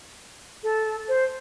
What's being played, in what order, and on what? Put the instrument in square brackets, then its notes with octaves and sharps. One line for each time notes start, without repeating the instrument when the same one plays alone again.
[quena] A4
C5